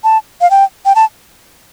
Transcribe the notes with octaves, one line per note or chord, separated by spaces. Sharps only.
A5
F5
G5
G5
A5